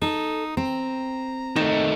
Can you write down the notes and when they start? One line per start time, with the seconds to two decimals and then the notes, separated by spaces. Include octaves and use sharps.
0.02 D#4 A4
0.57 C4 A#5
1.56 D#3 A3 D#4